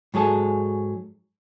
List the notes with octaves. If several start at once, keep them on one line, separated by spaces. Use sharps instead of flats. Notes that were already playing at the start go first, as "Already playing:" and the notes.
G#2 F#3 G#4 A4 A5